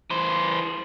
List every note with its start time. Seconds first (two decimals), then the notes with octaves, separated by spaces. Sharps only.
0.10 E3 C5